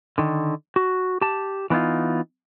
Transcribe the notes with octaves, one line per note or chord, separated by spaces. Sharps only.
D3 D#3
F#4
G4 A5
E3 B3 C#4 D#4 F4